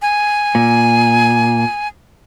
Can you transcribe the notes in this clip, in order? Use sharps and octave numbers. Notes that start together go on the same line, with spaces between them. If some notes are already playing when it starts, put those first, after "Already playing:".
G#5
A#2